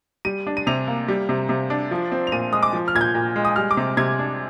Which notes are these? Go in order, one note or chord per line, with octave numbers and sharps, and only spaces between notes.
G3 D#7
D4
D#7
C3 F7
A#3
G3
C3
C3
D4
F3
C4
F7
A#2 D#7
G#3 D#6
D6
F3
F6
A#2 G#6
G6
A#2
G#3
D#6
G3 F6
D6
C3
C3 G#6
D4